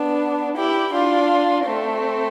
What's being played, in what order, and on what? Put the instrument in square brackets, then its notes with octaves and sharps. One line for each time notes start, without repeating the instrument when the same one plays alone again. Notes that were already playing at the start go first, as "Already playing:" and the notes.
Already playing: [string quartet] B3 D4
E4 G4
D4 F4
A3 C4